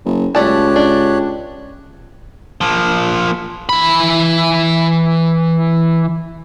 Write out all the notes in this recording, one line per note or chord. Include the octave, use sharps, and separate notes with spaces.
F#1
C#2 A3 G4 C#5 D5 A5 F#6
D4
F3 A#3
E3 B5